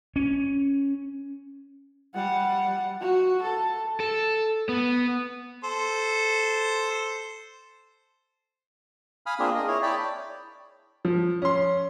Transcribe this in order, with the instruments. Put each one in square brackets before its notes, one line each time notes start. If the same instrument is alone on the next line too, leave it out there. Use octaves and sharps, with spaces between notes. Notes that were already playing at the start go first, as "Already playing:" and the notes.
[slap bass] C#4
[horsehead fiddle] G3 F#5
F#4
A4
[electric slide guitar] A4
B3
[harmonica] A4 C5
[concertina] F5 G#5 B5 D#6 F6
A#3 C4 D4 F4 G#4
G#4 A#4 D#5
E4 G#4 C#5
C#5 D5 G5 A5 B5
[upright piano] F3
C#4 C6